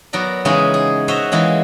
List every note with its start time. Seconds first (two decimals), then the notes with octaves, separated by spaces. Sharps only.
0.13 F#3 B3 A#4 D5
0.45 C#3 E3 G#3 C#4 D#4
0.74 G#4
1.08 F#4 C5 C#5 D#5 E5 F#5
1.32 E3 G#3 A#3 C#4